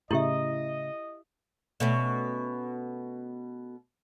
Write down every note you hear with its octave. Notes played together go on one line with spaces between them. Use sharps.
A2 C#3 E4 G4 D#5 E5
B2 A3 C#4